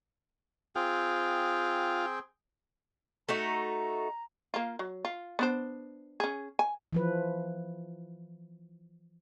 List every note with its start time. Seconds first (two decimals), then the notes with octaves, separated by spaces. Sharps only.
0.76 C4 F4 G#4 G5
3.29 A3 D#4 F#4 A#5
4.54 A#3 F4
4.79 F#3
5.05 F4
5.39 B3 D4 C5
6.20 C#4 G#4
6.59 G#5
6.93 E3 F3 B4